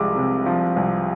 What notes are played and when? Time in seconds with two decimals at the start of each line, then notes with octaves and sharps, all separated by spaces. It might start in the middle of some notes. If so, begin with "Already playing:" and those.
Already playing: C2 F3 G#3 D6
0.16 C3
0.46 F3
0.76 C2